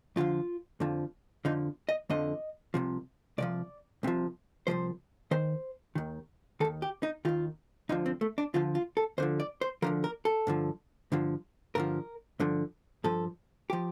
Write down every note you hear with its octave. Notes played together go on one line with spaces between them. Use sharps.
F2 D3 F3 F4
F2 D3 F3
F2 D3 F3 D#4
D#5
F2 D3 F3 D#5
C2 C3 F3
C2 C3 F3 D5
C2 C3 F3
C2 C3 F3 C5
D#2 D#3 C5
D#2 D#3
D#2 D#3 A4
G4
D#4
D#2 D#3 F4
D2 D3 F3 D#4
C4
A3
D4
D2 D3 F3 F4
F4
A4
D2 D3 F3 C5
D5
C5
D2 D3 F3 A#4
A#4
A4
G2 D3 F3
G2 D3 F3
G2 D3 F3 A#4
G2 D3 F3
G2 F3 A4
F3 G4